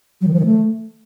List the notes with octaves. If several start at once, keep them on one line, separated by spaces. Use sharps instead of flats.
F#3
D#3
F3
D#3
A3